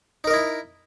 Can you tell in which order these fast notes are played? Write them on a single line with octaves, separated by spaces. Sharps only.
D#4 A#4 D#5 E4